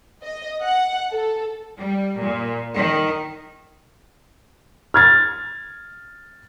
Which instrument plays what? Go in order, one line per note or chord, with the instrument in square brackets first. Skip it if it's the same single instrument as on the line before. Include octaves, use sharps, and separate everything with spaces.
[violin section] D#5
F#5
A4
[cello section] G3
A#2
D#3
[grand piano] F6 G#6 A6